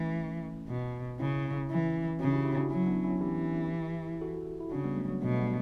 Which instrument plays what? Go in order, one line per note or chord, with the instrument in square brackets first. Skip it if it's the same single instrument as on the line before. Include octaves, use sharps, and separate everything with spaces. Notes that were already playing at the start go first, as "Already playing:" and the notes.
Already playing: [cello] E3 [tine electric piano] A3 C#4
[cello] B2
[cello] C#3 [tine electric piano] C#4 E4
[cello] E3 [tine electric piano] C#4 E4
[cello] C#3 [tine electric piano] D4 F#4
[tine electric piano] E4 G4
E4 G4
D4 F#4
[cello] F#3 [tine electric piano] C#4 E4
[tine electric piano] B3 D4
C#4 E4
[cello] E3 [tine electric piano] E4 G4
[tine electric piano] F#4 A4
E4
[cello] C#3 [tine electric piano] D4 F#4
[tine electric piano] G3 B3
F#3 A3
F#3
[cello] B2 [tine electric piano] F#3 A3
[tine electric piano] A3
G3 B3